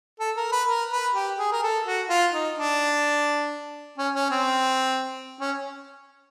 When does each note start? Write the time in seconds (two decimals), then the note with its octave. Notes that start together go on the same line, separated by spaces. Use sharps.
0.20 A4
0.36 A#4
0.52 B4
0.68 A#4
0.92 B4
1.14 G4
1.38 G#4
1.52 A#4
1.63 A4
1.86 F#4
2.09 F4
2.33 D#4
2.57 D4
3.98 C#4
4.15 C#4
4.31 C4
5.40 C#4